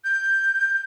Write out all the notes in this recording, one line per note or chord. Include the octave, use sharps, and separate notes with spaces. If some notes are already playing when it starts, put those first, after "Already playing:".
G6